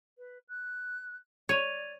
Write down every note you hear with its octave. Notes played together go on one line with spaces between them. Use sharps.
B4
F#6
C#5 D5 G#6 D#7 F7